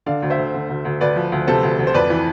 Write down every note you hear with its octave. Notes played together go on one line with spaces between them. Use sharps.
D3 D5 F5
D2
C5 E5
D2
D3
D2
D2
D2 B4 D5
F3
D2
C3 A4 C5
D2
D2
C5
F2 B4 D5
E3